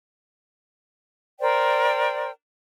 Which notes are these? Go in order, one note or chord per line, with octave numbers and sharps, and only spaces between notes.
A#4 C5 D5 G5